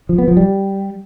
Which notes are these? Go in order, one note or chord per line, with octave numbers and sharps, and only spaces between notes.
F3
B3
F3
G3